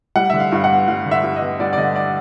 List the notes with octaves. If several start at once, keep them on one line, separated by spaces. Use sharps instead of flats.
G3 F#5
D3 E5
F5
G2 F5
F#5
B3
G3 F5
D3
E5
G2
D#5
B3
G3 D5
D5
D3 D#5
D5